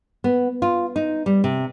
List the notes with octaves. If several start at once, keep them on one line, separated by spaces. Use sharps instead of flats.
B3
F4
D#4
G3
C3